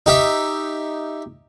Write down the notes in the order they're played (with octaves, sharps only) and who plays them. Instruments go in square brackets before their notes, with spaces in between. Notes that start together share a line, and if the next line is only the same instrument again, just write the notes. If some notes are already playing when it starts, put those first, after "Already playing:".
[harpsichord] D#4 G4 E5